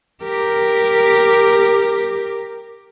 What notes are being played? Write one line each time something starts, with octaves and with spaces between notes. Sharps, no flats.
G4 A#4